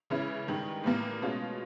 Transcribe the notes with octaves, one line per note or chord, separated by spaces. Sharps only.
C#3 E3 G#3 C#4 E4
G2 D#3 G#3
A2 E3 G3 A#3
B2 G#3 C#4 F4